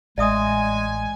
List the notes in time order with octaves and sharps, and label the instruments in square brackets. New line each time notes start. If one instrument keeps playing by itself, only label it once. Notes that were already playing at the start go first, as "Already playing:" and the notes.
[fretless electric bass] A1 [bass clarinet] G#3 [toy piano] D5 E5 D#6 [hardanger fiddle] G#5